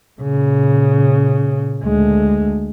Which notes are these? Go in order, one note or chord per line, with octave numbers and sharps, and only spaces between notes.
A#2 C#3
D2 G#3